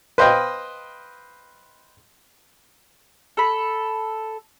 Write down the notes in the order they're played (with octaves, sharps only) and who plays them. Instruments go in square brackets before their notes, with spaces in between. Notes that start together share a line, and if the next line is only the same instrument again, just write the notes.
[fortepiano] B4 C5 D#5 F5 G5
[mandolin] A4 B5